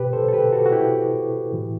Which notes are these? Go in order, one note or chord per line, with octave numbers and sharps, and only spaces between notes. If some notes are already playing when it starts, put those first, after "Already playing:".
Already playing: B2 G4 B4
A4 C5
A4
G4 B4
F#4 A4
F#4
E4 G4
A2 E3